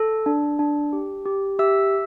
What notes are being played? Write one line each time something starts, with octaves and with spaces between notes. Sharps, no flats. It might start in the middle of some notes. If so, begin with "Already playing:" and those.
Already playing: A4
D4
D4
G4
G4
G4 E5 E6